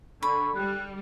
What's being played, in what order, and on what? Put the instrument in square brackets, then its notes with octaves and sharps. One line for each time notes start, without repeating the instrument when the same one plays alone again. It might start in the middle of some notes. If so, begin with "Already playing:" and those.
[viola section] D3 [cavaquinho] B5 [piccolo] C#6
[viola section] G3 [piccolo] F#6